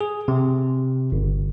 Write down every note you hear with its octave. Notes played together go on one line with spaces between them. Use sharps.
G#4
C3
G1